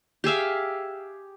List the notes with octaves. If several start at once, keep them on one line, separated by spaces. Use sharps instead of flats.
G4 G#4 E5 F5